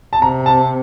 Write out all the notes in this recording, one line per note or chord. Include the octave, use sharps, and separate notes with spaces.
A5
C3 A#5
A5